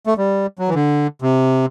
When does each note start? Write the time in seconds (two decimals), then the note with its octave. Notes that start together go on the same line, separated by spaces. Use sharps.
0.07 A3
0.17 G3
0.59 F#3
0.68 E3
0.74 D3
1.22 C3